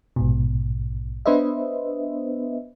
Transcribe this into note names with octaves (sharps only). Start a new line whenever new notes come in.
A#1 G#2 B2
B3 D4 B4 C5 D#5 E5